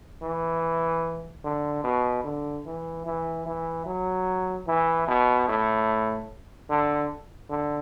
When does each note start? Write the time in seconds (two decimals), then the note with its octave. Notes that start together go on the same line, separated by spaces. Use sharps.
0.22 E3
1.44 D3
1.84 B2
2.24 D3
2.66 E3
3.06 E3
3.46 E3
3.86 F#3
4.67 E3
5.08 B2
5.48 A2
6.70 D3
7.50 D3